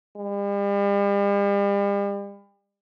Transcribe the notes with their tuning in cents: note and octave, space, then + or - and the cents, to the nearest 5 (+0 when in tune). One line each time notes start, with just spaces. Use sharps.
G3 +40